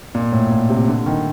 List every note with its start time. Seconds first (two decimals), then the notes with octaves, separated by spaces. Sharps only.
0.15 A#2
0.32 A2
0.50 A#2
0.69 C3
0.88 D3
1.06 D#3